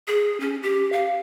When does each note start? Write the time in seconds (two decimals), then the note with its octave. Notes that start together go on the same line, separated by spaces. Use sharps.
0.08 G#4
0.40 C#4
0.63 G4
0.92 F5